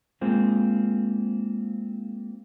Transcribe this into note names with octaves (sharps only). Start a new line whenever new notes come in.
G#3 A#3 C4 F4